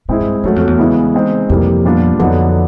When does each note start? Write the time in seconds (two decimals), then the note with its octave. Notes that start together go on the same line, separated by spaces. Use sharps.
0.09 A2 G#3 C4 E4 G#4
0.21 G2
0.44 F#2 F#3 A3 C#4
0.56 F2
0.67 E2
0.78 C#3 E3 G#3 B3 E4
1.14 G#3 C4 D#4
1.49 F2 C3 E3 G3 A#3
1.85 A#2 G3 B3 D4 F4
2.19 F2 D3 F#3 B3 D#4